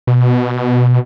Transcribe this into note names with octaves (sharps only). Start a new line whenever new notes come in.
B2